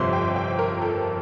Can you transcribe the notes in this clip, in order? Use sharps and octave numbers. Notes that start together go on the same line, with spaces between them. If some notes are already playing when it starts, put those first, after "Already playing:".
Already playing: G1 F2 C3 F3 C6
G5
G5
A#4
A4